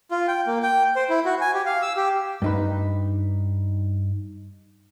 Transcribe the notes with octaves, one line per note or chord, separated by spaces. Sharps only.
F4
G5
A#3
G5
C5
E4
F#4
G#5
G4
F5
E6
G4
G2 D#4 B4